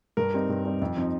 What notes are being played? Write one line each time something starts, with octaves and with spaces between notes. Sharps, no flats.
G2 A#4
G3 C4 D#4
G2
G3 C4 D#4
F2
F3 C4 D#4